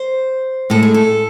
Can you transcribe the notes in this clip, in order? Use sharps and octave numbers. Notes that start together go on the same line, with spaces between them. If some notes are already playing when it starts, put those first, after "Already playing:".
Already playing: C5
A2 G#3 A4
G#4
A4